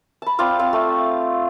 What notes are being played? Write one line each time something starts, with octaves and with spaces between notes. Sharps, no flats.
A5 B5
C4 F4 D5 F5
C4 F5
A3